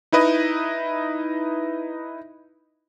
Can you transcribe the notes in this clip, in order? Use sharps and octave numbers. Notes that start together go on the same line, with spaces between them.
D#4 E4 B4 D#5